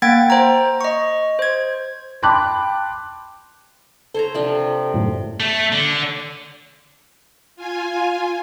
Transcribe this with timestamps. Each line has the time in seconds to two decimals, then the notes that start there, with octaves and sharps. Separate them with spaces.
0.02 A#3 F#5 G5 G#6 A6 D7
0.30 C5 A#5
0.81 D#5 C#6
1.39 C5 G#6
2.23 G5 A5 B5 C6 D6 F#6
4.14 A4 C5 C#5 A#5
4.34 C3 F3 D4
4.94 F#2 A2
5.40 A3
5.72 D3
7.56 F4 G#5